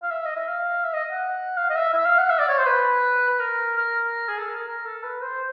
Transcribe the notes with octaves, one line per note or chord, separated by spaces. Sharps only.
F5
E5
D#5
E5
F5
E5
D#5
F#5
F5
D#5
E5
E5
F5
F#5
E5
D5
C#5
C5
B4
B4
A#4
A#4
G#4
A4
A#4
A#4
A4
B4
C5